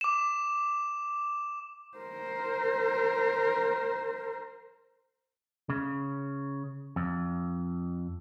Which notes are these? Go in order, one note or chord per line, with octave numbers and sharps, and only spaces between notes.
D6 E7
A#4 C5
C#3
F2